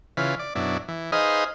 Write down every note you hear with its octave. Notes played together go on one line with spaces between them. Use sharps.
C#3 E3 F4 B4
D5
F#2 B2 D4 E4
E3
D#4 G#4 B4 C5 D#5 F5